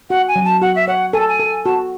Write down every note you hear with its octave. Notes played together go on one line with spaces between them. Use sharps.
F#4 F#5
G#5
F#3
A5
F#4 F#5
E5
C#5 F#5
A4 G#5
A5
G#5
A4
F#4 A5